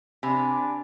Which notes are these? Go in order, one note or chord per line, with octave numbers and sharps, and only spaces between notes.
C3 D4 G#5 B5